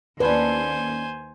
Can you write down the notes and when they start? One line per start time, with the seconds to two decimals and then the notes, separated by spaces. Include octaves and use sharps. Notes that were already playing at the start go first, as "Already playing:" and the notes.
0.20 D#2 C#4 D4 B4 C5 G#5